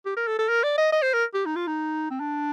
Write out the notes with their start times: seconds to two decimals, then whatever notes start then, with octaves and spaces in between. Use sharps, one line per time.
0.06 G4
0.17 A#4
0.27 A4
0.38 A4
0.49 A#4
0.63 D5
0.78 D#5
0.92 D#5
1.02 C5
1.13 A#4
1.34 G4
1.46 D#4
1.56 F4
1.67 D#4
2.10 C4
2.20 D4